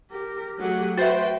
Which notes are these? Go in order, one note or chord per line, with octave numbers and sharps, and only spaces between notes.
G4 A#4
F#3 A3 G4 G#4 F#5
F#4 B4 C5 E5 G5 A6